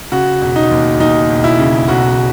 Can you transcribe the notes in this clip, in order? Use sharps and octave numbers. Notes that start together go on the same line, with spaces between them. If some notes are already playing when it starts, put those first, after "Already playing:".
C#3 F#4
E1
D#4
D#2
D#2 D#4
E1
E4
C#3
B1 F#4